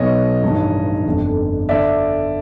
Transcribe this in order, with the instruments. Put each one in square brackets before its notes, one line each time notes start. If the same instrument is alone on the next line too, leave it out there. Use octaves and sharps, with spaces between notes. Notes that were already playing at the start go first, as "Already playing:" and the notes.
Already playing: [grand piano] B1 B2 C#5 D#5
A1 G2 D#3
G1 F2 D3
D3 D5 E5